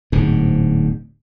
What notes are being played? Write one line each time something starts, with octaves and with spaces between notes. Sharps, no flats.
D1 G#2 B2